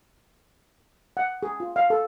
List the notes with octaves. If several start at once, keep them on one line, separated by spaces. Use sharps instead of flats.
F#5
G#4
F4
F5
A4